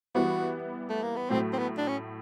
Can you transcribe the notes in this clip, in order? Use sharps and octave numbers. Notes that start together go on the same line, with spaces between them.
E3 G3 B3 E4 F#4
A3
A#3
B3
A2 F#3 A3 C4
C4
B3
D4
C#4